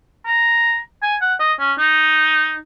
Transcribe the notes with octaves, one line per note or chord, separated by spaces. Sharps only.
A#5
G#5
F#5
D#5
C#4
D#4